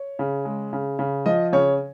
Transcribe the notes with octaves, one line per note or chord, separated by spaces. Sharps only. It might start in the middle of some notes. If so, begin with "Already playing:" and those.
Already playing: C#5
C#3
G#3
C#3
C#3
F3 D#5
C#3 C#5